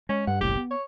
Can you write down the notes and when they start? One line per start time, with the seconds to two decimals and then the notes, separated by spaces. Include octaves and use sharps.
0.09 G#3 C#4
0.27 G2 F#5
0.41 F#1 C2 A2 G4
0.57 B3
0.71 C#5